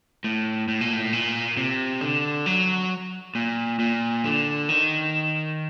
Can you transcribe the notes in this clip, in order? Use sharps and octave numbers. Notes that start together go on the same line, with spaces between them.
A2
A2
A#2
A2
A#2
C3
D3
F#3
A#2
A#2
D3
D#3